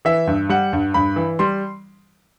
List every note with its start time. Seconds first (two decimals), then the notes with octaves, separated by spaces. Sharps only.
0.05 E3 E5
0.27 G2
0.49 G3 F#5
0.73 G2
0.94 G2 B5
1.16 E3
1.39 G3 C6